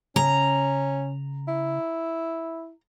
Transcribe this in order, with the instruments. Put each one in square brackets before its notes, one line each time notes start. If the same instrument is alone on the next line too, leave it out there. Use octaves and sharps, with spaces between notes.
[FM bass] C#3 [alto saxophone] C#4 [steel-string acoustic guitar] A#5
[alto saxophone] E4